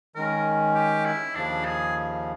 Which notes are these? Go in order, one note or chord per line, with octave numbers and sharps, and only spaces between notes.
D#3 G#3 C#4 A#4
G4
E4
D#2 C#3 F3 D4
G#4